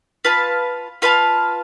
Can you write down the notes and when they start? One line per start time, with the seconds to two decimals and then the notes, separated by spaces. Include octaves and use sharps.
0.25 F4 B4 F5 A5
1.02 F4 B4 F5 A5